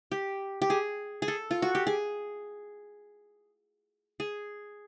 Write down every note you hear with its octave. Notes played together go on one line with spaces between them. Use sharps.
G4
G4
G#4
G#4
A4
F4
F#4
G4
G#4
G#4